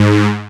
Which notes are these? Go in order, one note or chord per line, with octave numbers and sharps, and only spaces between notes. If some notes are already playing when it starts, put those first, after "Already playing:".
Already playing: G#2